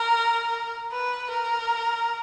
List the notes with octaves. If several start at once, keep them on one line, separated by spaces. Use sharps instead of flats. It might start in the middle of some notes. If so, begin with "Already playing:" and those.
Already playing: A#4
B4
A#4